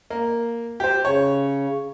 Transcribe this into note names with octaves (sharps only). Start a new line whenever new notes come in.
A#3
G4 C5
C#3 C#5